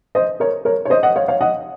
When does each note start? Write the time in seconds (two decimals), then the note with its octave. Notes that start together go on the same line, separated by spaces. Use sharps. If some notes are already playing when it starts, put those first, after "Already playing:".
0.15 C5 D#5
0.40 A#4 C#5
0.65 A#4 C#5
0.85 C#5
0.90 C5 D#5
1.03 D#5 F#5
1.16 C#5 F5
1.28 C#5 F5
1.41 D#5 F#5